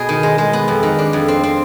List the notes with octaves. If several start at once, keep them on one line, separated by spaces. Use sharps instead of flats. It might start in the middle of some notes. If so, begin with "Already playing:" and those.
Already playing: B2 D#4 G#4
D#3
G#3
G#3
B3
F2
D#3
D4
F2
C4
C4